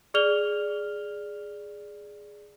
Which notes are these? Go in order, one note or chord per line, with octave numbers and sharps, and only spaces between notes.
G#4 D5 F6 F7 G7